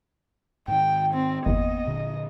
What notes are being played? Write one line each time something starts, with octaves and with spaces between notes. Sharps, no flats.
G#2 D#3 G5
C4
G1 E2 A#3 B3 D#5
A#2 D3